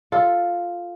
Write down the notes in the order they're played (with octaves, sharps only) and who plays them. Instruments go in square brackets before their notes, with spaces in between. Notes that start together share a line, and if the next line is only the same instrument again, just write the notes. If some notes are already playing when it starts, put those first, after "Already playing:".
[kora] F4 A4